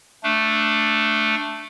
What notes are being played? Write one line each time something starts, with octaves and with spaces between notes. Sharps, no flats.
A3 D4